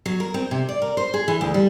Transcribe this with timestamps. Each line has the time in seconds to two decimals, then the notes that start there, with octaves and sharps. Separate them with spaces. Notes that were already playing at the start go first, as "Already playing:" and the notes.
0.06 F#3
0.20 A#4
0.34 C4
0.51 C3
0.69 D5
0.82 A#4
0.97 C5
1.14 G#4
1.28 E3
1.41 D2
1.54 G3